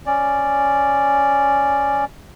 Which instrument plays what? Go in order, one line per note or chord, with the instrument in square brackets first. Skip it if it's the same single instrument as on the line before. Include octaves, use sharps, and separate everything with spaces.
[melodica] C#4 D5